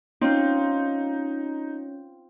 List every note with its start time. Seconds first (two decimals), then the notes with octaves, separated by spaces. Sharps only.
0.21 C4 C#4 D#4 F4 C#5 G6